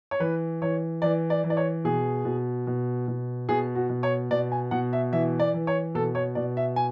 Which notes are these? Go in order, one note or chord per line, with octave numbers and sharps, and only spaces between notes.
C#5
E3 B4
E3 C#5
E3 D5
D5
E3
D5
C#5
B2 G#4
B2
B2
B2
B2 G#4
F#4
B2
C#5
B2 D5
G#5
B2 F#5
E5
E3 E5
D5
E3
C#5
B2 A4
C#5
B2 D5
E5
G#5